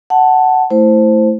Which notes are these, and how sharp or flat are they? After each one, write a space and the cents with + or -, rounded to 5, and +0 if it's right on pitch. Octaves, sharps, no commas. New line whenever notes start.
F#5 +10 A5 +0
A3 +0 E4 +0 C5 +0